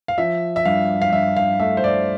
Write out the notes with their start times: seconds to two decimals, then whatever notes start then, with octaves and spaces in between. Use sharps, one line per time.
0.08 F5
0.18 F3 E5
0.56 E5
0.65 G2 F5
1.02 F5
1.12 G2 E5
1.37 F5
1.60 A3 E5
1.77 C5
1.84 D5